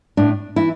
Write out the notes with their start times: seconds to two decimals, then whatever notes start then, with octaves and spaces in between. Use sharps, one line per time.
0.17 A2 D4
0.56 E3 E4